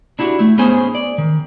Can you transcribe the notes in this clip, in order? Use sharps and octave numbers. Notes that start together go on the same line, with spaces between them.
D4 E4 F#4 G4
A3 E4
B3 C#4 D#4 G#4 C5 G#5
D5
D#3